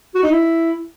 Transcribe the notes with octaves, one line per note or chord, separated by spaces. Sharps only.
F#4
D#4
E4